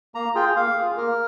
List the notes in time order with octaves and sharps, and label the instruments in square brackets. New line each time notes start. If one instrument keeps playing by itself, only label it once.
[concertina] A#3 A#5
F4 G#4 G5
A#3 F5
F4 G#4
A#3 A#4